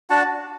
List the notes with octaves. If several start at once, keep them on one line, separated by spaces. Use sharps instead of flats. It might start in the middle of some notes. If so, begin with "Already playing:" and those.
D4 F#4 F#5 A5